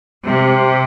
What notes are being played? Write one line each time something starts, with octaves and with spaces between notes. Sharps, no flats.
C3